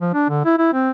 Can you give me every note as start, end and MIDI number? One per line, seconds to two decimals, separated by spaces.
0.01 0.13 53
0.14 0.26 62
0.29 0.41 50
0.45 0.54 64
0.58 0.71 64
0.73 0.91 60